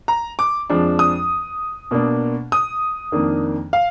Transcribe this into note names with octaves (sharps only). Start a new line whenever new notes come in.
A#5
D6
F2 F3 G#3 D4
D#6
B2 A#3 D4
D#6
F2 D#3 A#3 D4
F5